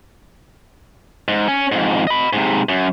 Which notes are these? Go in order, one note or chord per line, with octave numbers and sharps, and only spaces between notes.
G#2
C#4
F2 G#2
D#5 B5
G#2 C3
F#2